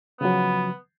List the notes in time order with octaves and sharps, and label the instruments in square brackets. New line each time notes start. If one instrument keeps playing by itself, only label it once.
[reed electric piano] C#3 F3 F#3 [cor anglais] B3